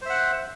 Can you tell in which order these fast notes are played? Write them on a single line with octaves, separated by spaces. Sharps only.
C5 E5 F#5